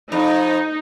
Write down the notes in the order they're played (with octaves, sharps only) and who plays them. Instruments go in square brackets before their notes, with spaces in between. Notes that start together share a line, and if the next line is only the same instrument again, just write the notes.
[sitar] F2 [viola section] D#4